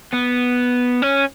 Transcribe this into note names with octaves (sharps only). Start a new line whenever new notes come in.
B3
C#4